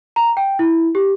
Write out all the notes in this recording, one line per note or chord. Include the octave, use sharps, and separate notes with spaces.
A#5
G5
E4
G4